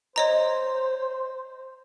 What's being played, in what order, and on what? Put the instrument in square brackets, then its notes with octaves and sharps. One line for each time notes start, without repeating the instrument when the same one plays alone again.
[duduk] C5 [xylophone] C#5 D#5 A#5